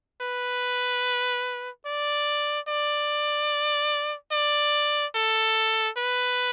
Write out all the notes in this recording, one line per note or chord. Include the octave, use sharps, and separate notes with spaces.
B4
D5
D5
D5
A4
B4